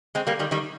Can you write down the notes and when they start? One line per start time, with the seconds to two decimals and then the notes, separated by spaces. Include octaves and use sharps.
0.15 G#3 C4
0.27 G3 A#3
0.39 D#3 G3
0.51 D#3 G3